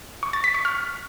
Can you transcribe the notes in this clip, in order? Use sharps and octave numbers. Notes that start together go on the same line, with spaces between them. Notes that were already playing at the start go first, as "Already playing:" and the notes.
C#6
A6
B6
C#6
F6